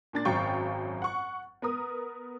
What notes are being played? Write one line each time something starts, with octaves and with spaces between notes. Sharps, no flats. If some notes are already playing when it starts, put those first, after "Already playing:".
A#2 D4 A6
G#1 F#2 F#3 F5 G5 C#6
F#5 C#6
B3 A#4 D#6